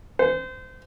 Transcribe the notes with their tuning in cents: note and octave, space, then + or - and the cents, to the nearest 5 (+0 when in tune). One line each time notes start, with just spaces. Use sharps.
C5 -30